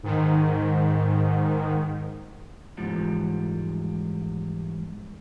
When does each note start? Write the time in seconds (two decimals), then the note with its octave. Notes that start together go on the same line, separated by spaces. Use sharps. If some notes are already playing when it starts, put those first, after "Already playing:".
0.03 G#2 D#3
2.77 E2 G#2 F3 G3